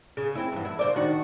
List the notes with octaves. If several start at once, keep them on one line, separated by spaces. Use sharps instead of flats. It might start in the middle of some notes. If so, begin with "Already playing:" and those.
C#3
C4 E4
E2 G2
E4
C#3 C5 D5
D#3 D4 F#4